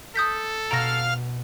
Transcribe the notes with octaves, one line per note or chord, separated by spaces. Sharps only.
A4 D#6 G6 B6
B2 F5 A#5 F6 A#6 D7